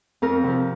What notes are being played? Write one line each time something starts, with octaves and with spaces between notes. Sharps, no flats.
F2 A#4
C3 F3